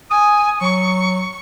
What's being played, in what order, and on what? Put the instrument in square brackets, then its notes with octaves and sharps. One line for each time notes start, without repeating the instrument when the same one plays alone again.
[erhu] G#5 [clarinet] D#6
[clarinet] F#3 [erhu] C#6